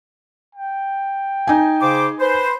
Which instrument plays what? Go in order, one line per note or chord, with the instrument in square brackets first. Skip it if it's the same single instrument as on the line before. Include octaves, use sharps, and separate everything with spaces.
[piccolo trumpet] G5
[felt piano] D#4 G#5
[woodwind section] C#3 C5 D6
[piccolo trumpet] B4 [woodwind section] C5